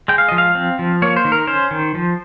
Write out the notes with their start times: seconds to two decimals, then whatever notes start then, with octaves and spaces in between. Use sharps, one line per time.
0.08 G#3 G5
0.18 F5
0.29 F3 D#5
0.38 F5
0.55 C4
0.79 F3
1.02 A#3 C#5
1.16 C5
1.25 D#3
1.32 A#4
1.47 C#4 C5
1.71 D#3
1.95 F3